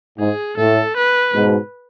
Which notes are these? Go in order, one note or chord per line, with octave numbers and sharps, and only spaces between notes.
G#2 G#4
A2 A4
B4
G#2 B2